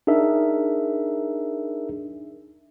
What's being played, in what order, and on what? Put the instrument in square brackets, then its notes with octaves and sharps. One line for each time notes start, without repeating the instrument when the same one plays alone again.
[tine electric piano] D4 D#4 G#4 A#4 E5